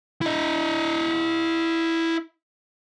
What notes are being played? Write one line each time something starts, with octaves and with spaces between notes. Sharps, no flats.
E4 D#5